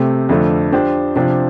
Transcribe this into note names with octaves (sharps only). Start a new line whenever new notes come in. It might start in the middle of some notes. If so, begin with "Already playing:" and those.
Already playing: C3 A3 C4 G4
F2 D3 A3 D4
F3 D4 G4 C5
C3 F3 D4 G4